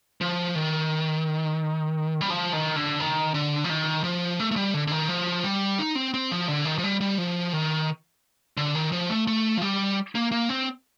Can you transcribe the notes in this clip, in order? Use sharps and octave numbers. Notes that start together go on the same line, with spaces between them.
F3
D#3
G3
F3
D#3
D3
D#3
D3
F3
D#3
F3
A3
A3
G3
D3
D3
D#3
F3
G3
D#4
C4
C4
F3
D3
D#3
F3
G3
G3
F3
D#3
D3
D#3
F3
A3
A3
F3
G3
A#3
A#3
C4